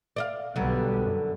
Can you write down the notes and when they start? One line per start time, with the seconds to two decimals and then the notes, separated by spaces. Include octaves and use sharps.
0.16 D5 D#5 F5
0.56 B1 D3 F#3 G3 B3
1.04 F#2